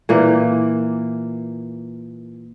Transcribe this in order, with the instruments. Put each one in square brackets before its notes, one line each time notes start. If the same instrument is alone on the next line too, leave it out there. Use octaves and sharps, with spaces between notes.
[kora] A#2 E3 A#3